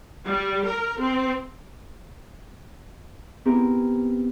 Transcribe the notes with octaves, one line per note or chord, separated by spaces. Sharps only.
G3
A#4
C4
B3 C4 E4 G4 G#4 A#4